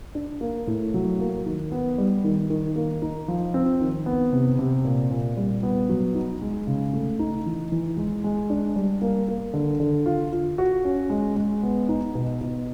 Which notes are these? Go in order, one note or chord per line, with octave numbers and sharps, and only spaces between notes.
D4
A#3
A2
F#3
A#3
D#3
B3
G3
D#3
D#3
A#3
D#4
F3
C4
D#3
B3
C3
C3
A#2
A#2
G3
B3
F#3
D#4
G#3
C#3
A3
D#4
E3
E3
G#3
G#3
D4
G3
A#3
A#3
D3
D3
F4
F4
F#4
C#4
G#3
G#3
B3
D#4
B2
B2